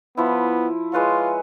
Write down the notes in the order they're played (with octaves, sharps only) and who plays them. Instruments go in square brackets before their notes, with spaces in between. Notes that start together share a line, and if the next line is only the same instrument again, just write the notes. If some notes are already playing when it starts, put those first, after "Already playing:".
[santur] F3 E4 [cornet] B3
[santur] G#3 B4 C#5 [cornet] F4